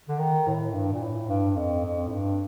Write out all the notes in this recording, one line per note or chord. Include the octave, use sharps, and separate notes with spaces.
D3
D#3
A2
G2
A#2
A2
G2
F2
F2
A2
G2